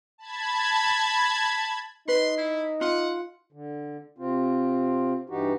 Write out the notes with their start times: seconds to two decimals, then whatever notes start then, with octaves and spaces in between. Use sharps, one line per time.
0.18 A5 B5 G#6
2.08 D#4 B4 C6
2.38 E4
2.81 F4 F#5
3.53 D3
4.18 C3 C4 F4
5.29 G2 E3 D#4 F#4 G4